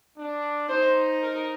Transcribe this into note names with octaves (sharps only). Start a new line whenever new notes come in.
D4
D#4 C5
A#4